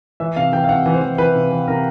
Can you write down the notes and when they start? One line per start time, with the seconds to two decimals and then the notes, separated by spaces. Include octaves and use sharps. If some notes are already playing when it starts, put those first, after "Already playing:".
0.20 E3 E5
0.36 C3 F5
0.52 E3 G5
0.64 F5
0.69 C3 F#5
0.86 E3
0.94 C5
1.02 E3
1.18 E3 B4
1.35 C3
1.51 E3
1.68 C3 A#4